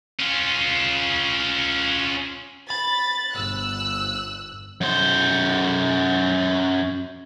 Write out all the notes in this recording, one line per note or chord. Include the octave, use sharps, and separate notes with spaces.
C#4 F4
B5 A6
G1 E6 F#6
F#2 C5